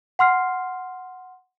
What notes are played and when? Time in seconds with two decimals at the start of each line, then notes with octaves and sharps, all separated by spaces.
0.19 F#5 C6 F6 C7